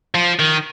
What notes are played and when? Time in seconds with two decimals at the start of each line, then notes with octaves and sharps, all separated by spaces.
0.15 F3
0.39 D#3